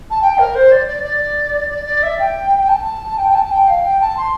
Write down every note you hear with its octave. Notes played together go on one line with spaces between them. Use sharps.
A5
G5
A#4
C5
D5
D5
D5
D5
D5
E5
G5
G5
A5
G5
G5
A5
G5
F5
G5
A5
C6